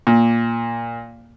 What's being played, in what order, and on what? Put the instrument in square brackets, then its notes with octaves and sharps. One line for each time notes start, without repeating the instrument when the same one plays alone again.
[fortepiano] A#2